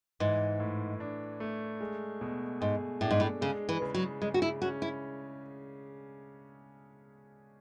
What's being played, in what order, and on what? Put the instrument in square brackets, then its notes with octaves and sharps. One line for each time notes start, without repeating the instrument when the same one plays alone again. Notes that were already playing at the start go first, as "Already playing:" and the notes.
[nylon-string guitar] G#2 [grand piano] E3
[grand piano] A2
D4
A3
G#3
B2
[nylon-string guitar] G#2 [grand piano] G#4
[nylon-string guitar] A2 [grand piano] D4
[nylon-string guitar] G#2
A2
[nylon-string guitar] C#3 [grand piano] G#3
[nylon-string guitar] E3
[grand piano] C#3
[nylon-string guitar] F#3
[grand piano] C#3 [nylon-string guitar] G#3
[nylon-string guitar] F#4
E4
[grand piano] C#4 [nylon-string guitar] F#4
[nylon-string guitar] E4